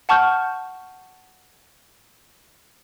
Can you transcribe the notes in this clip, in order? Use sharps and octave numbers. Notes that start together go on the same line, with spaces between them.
F#5 A5 C#6 F6 G6